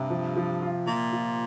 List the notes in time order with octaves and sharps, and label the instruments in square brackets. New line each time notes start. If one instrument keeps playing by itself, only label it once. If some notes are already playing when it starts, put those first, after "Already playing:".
Already playing: [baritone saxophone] G2 [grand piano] C3
[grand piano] F3
F3
F4
[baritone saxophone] A#2 [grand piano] F3
[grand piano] F4